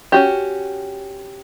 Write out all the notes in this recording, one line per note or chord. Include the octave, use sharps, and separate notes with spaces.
C#4 F#4 G4